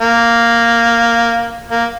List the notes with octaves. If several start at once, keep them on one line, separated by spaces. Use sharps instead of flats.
A#3
A#3